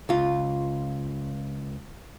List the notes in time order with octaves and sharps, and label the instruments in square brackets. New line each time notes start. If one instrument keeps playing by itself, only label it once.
[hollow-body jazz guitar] C#2 F4